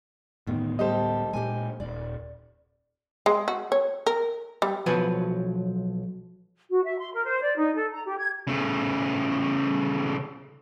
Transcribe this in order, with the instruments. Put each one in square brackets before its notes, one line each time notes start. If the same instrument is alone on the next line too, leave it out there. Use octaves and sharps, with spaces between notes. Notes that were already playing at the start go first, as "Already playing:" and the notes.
[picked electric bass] D2 A2 B3 [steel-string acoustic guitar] D#3
[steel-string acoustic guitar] G3 G4 A4 [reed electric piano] C5 D#5
[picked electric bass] A#2 G#3 [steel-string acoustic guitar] G4 G#5
[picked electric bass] D#1 [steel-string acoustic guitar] D5
[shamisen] G#3
F#4
C#5
A#4
G3
[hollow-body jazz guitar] B1 F3 F#3 B4 G#5
[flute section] F#4
E5
C6
A#4
C5
D5
D#4
A4
A#5
G4
G#6
[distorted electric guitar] C#3 A3